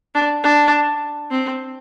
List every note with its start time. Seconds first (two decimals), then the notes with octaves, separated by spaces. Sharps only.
0.15 D4
0.44 D4
1.31 C4